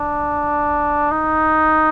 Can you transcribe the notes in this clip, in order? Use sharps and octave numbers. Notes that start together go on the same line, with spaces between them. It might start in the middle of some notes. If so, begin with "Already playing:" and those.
Already playing: D4
D#4